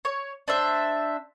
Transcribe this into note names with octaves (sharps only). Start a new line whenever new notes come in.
C#5
D4 C5 E5